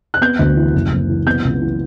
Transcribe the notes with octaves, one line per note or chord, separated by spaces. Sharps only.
F#6
B3 G6
D2
E3
F#1
F#1
E3
B3 G6
C#2
E3